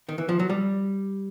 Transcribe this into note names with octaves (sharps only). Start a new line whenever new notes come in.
D#3
E3
F3
F#3
G3